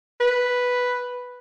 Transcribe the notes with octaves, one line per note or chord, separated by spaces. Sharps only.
B4